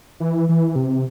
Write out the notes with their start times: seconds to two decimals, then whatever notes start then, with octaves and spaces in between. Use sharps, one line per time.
0.20 E3
0.49 E3
0.76 C3